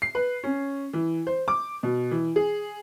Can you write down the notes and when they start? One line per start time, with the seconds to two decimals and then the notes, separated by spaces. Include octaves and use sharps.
0.02 C7
0.15 B4
0.43 C#4
0.93 E3
1.27 C5
1.48 D6
1.83 B2
2.11 E3
2.36 G#4